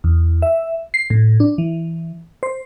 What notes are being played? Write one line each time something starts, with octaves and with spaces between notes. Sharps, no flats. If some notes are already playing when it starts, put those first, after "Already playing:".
E2
E5
C7
A2
D4
E3
C5